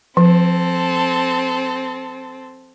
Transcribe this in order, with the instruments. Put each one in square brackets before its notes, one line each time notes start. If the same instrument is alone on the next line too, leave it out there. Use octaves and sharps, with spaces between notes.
[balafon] F3 [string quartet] C4 A4